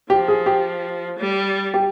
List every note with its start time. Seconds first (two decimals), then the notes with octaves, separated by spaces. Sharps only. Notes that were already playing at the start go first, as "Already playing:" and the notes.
0.10 F3 G4
0.28 G#4
0.46 G4
1.18 G3
1.74 G4